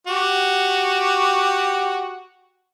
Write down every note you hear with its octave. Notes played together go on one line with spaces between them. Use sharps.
F#4 G4